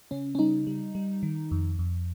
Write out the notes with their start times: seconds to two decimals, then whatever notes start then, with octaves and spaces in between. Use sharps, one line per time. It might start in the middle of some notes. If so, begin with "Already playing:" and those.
0.11 C#3 C#4
0.35 C#4
0.39 G3 D#4
0.67 G3
0.95 G3
1.23 D#3
1.51 F2
1.79 F2